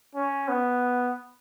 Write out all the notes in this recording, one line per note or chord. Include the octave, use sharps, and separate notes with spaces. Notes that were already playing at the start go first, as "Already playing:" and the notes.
C#4
B3